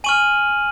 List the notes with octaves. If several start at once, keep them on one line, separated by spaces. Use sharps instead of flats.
G#5 C#6 F6 D#7 F#7